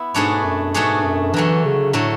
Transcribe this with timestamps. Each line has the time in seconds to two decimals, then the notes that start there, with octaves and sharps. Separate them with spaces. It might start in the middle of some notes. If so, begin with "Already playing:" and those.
Already playing: B3 E4
0.14 G#2 B2 A3 D4 G#4 C#5
0.44 F#2
0.74 G#2 B2 A3 D4 G#4 C#5
1.04 F#2
1.34 D3 E3 F#3 A3
1.65 C#3
1.93 A2 D3 F#3 A3